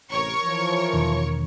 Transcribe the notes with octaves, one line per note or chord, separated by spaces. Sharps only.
A1 C3 A#4 C#5 C#6
E3 F3
E1 E2 D#3